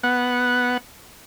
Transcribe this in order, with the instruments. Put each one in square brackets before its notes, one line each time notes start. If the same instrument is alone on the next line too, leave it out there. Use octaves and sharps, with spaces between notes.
[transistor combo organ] B3 F#5